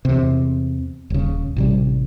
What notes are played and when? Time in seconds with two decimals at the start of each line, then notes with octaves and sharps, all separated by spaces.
0.05 E2 C3
1.10 D#1 C#3
1.56 A1 C3 G3